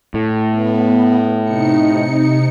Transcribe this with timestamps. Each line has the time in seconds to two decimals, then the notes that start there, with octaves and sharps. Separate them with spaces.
0.14 A2
0.49 B3
1.43 C3 D#4 C#7